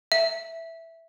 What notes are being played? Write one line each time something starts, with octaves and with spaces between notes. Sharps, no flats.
E5